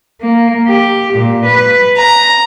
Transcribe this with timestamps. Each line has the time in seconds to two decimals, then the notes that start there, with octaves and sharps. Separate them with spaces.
0.21 A#3
0.66 G4
1.13 A#2
1.45 B4
1.98 A#5